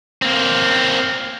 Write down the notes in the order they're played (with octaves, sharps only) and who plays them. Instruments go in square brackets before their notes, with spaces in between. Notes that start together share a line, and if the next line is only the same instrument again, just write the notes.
[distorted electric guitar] A#3 C4